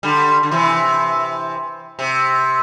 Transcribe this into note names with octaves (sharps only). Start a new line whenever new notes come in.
D3 G3
D3
C3 E3
C3